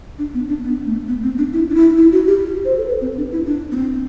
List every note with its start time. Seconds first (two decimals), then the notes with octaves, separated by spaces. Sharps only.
0.19 D4
0.34 B3
0.48 D4
0.63 B3
0.86 A3
1.08 B3
1.23 C4
1.38 D4
1.53 E4
1.70 D4
1.75 E4
1.97 E4
2.12 F#4
2.27 G4
2.65 C5
2.77 A4
2.88 B4
3.01 C4
3.17 D4
3.32 E4
3.46 D4
3.72 B3
3.76 C4